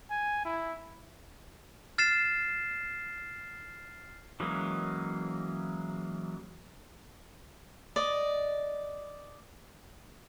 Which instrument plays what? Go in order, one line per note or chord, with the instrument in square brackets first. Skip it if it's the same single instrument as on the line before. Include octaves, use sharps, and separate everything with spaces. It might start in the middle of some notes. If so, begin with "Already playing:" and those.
[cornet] G#5
E4
[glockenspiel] F6 A6 C7 E7
[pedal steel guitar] E3 F#3 G#3 A#3 C#4
[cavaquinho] D5 D#5